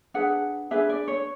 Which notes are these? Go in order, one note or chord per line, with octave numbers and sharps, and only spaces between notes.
D4 G#4 B4 F#5
D4 G#4 B4 E5
D5
C#5